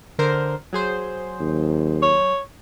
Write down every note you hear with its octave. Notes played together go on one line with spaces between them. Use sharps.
D3 A#4 C5
F#3 G#4 C5
D#2
C#5